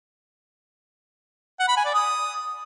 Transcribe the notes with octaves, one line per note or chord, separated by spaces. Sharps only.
F#5
B5
G#5
D5
D#6